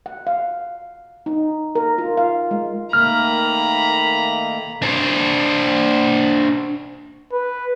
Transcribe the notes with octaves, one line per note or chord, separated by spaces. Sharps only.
F#5
F5
D#4
A#4
F4
F5
G#3
D#3 A3 A#3 A#5 B5 F6
D4 C5
B4